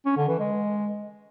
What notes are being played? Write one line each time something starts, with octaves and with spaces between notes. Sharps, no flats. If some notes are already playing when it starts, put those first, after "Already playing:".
C#4
D3
E3
G#3